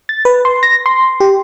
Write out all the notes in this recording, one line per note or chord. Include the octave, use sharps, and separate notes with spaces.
A6
B4
C6
A#6
C6
G4